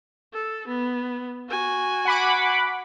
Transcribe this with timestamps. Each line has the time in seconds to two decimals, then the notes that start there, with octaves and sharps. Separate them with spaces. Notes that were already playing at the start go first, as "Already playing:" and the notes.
0.33 A4
0.68 B3
1.49 F#4 G#5
2.05 F#5 B5 D6